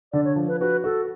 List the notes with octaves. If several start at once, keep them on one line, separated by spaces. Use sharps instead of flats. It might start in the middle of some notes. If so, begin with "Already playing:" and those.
D3 D5
C#5
F3
B4
F#4 B4
F#4 A4